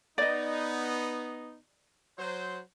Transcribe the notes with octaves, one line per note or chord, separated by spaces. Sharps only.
B3 D#4 D5 D#5
F#3 C5